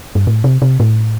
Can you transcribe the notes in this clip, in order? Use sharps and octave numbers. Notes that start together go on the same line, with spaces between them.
G2
A2
C3
C3
A2